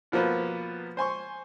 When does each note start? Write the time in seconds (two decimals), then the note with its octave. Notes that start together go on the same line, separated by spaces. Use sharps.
0.12 B2 F3 A#3 B3 B4
0.97 C5 G#5 C6 C#6